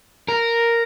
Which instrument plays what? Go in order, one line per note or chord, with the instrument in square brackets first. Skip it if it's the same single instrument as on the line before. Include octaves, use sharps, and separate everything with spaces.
[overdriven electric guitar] A#4